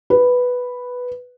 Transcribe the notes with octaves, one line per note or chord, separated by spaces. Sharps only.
B4